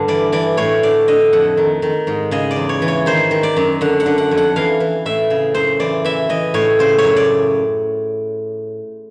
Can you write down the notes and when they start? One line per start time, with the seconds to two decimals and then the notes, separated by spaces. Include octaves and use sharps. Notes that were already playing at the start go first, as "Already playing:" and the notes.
Already playing: G2 D3
0.08 E3 D5
0.32 E3 D5
0.57 A2 C#5
0.83 D3 D5
1.08 D3 D#5
1.33 F2 F#5
1.57 D#3
1.82 D#3
2.07 G#2
2.31 C#3 D#5
2.51 D5
2.56 E2
2.69 C#5
2.82 E3
2.88 C#5
3.06 D#3 C5
3.31 D#3
3.43 D5
3.57 F#2
3.81 D3 F#5
4.00 F#5
4.06 D3
4.18 F#5
4.31 F2
4.37 F#5
4.56 E3 F5
4.80 E3
5.06 A2 E5
5.30 C#3
5.55 F#2 C5
5.80 E3 D5
6.05 E3 E5
6.29 E3 D#5
6.54 A2 C#5
6.79 C#3 C5
6.98 C#5
7.04 F#2
7.16 D5